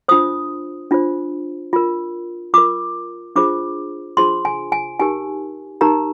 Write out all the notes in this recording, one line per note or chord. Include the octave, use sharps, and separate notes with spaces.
D4 F4 C5 D#6
D4 F4 C5
F4 A#4
F4 A#4 D6
D4 F4 G#4 C5 D6
D4 F4 G#4 C5 C6
G#5
G#5
D#4 G4 A#4 G#5
D#4 G4 A#4 A#5